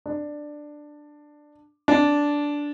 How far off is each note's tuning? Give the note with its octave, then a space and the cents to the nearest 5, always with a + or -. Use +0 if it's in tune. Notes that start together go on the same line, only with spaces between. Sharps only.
D4 +10
D4 -10